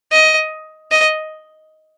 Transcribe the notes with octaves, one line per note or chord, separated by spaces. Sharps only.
D#5
D#5